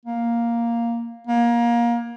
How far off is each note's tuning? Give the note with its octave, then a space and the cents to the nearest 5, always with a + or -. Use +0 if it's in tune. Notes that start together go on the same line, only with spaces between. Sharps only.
A#3 +5
A#3 +25